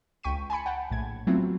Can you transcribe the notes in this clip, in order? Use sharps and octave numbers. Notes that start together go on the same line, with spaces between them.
C#2 G5 C#6 B6 D#7
G#5 A5 B5 C#7
F#5 G5 A5
A#1 A2 G#6
F#3 A3 B3 C4 E4 F4